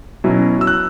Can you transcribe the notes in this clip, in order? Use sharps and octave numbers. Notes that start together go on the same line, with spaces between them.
B2 F#3 C#4 E4
E6
F#6